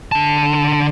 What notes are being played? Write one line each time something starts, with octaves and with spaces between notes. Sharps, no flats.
D3 A5